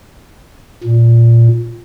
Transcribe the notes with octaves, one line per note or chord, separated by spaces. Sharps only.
A#2